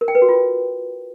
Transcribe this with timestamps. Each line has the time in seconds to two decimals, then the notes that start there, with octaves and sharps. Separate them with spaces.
0.01 A#4
0.08 G5
0.15 B4
0.22 F#4
0.29 F4